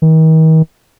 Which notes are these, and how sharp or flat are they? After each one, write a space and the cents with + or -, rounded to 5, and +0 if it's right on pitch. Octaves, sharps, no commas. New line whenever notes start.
D#3 +40